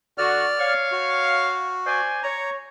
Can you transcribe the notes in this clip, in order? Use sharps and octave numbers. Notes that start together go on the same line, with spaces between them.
D3 F#4 D5 F6
C#5 F5
F#4
C5 D5 G#5
C#5 A#5